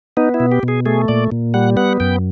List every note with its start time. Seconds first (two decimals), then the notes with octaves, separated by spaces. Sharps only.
0.17 B3 D#4
0.34 E4
0.40 B2
0.52 G4
0.63 B2
0.68 G#4
0.86 A3 G#4
1.08 A#2 D5
1.32 A#2
1.54 G3 F#5
1.77 B3 F#5
2.00 F#2 G5